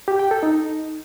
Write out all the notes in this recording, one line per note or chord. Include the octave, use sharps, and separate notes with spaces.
G4
G5
A4
D#4